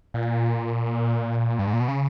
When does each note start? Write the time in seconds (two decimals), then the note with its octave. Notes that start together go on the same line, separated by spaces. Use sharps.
0.14 A#2
1.59 G2
1.67 G#2
1.73 A#2
1.80 B2
1.88 C#3